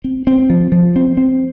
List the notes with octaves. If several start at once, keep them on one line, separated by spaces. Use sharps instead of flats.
C4
C4
F3
F3
C4
C4